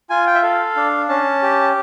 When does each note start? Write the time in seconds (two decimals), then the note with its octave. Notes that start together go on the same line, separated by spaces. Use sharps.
0.10 F4 G#5
0.27 G5
0.35 E5
0.43 A4 F5
0.76 D4
1.09 C#4 A5
1.43 G4